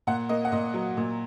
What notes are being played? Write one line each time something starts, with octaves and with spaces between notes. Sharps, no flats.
A#2 F#5
A#3 D#5
F#5
A#2 D#5
F#3
A#2